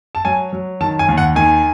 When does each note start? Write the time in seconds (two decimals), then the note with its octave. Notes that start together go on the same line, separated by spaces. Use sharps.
0.15 A5
0.25 F#3 G#5
0.53 F#3
0.81 D#3 A5
0.99 G#5
1.08 D#2
1.18 F#5
1.36 D#3 G#5